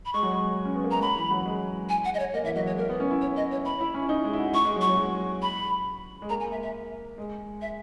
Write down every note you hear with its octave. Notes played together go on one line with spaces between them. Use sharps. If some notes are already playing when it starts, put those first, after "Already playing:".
B5
G#3 C#6
F#3
G#3
C#4
B3
A#3
G#3 A#5
F#3 B5
E3
F#3
G#3
G#5
F#5
D#5
C#5
A#3 D#5
E3 E5
F#3 D#5
G#3 C#5
A#3 A#4
B3
C#4
E4
C#5
D#5
C#5
B5
E4
C#4
E4
D#4
G#3
E4
F#4
E4 C#6
G#3
F#3
C#6
F#3
F#3
B5
G#3
A#3 A#5
G#5
E5
E5
G#3
E5